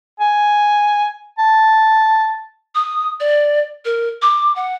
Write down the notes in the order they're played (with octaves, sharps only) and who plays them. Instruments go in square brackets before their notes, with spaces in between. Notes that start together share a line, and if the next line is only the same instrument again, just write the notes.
[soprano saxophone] G#5
A5
[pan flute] D#6
D5
A#4
D6
F#5